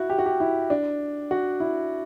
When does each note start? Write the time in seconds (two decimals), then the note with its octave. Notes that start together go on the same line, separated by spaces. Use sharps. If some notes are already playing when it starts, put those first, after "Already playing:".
Already playing: E4 F#4
0.10 G4
0.19 F#4
0.26 G4
0.40 E4
0.70 D4
1.31 F#4
1.60 E4